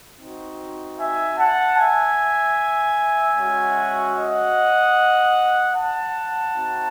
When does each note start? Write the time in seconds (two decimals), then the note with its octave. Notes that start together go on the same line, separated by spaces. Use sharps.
0.18 C4 D#4 F#4
0.97 E5 G#5
1.37 F#5 A5
1.77 E5 G#5
3.36 G#3 C#4 F#4
4.15 D#5 F#5
5.75 F#5 A5
6.54 C4 D#4 F#4